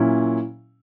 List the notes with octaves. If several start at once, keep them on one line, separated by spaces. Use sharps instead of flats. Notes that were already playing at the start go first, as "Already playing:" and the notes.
Already playing: A#2 F#3 C#4 E4